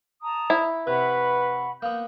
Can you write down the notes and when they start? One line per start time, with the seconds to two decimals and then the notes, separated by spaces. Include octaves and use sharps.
0.22 A5 A#5 D#6
0.50 E4
0.87 C3 B4 F#5 B5 C#6
1.82 A#3 B3 G6